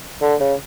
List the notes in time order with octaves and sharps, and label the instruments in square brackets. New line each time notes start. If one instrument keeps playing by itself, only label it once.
[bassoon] D3
C#3